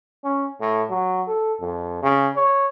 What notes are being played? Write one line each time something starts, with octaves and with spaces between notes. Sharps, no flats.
C#4
A2
F#3
A4
F2
C#3
C#5